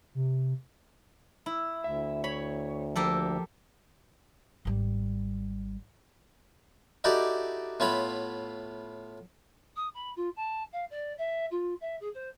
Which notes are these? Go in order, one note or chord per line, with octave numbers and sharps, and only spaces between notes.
C3
E4
D2 E5
C#5 B5
F3 A#3 G4 A4
G#1 G3
D#4 E4 F#4 G4 A4 D5
A2 B3 F4 C#5 E5 B5
D#6
B5
F4
A5
F5
D5
E5
F4
E5
G#4
C5